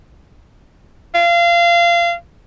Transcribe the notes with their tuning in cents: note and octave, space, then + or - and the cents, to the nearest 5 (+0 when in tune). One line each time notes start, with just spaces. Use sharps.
F5 -25